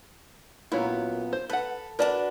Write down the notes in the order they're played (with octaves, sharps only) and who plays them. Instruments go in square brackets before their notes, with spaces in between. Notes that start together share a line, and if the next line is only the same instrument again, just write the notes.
[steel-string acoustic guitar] F#2 A#2 B3 [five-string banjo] E4 F#4 C#5
[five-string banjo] C5
[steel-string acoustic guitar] A4 [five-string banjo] B4 F#5
[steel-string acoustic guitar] D4 F#4 B4 [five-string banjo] A#4 D5 A5